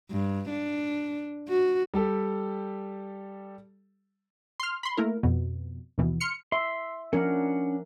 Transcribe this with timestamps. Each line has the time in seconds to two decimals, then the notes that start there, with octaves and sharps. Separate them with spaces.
0.11 G2
0.50 D4
1.49 F#4
1.94 G3 G4 A4
4.60 C6 F6
4.83 B5 C6
4.97 A3 A#3 E4 A#4
5.23 F2 B2
5.98 A#1 D#2 B2 E3
6.20 C6 F6 C#7
6.52 E5 C6
7.13 F3 C#4 D4 A#4 F#5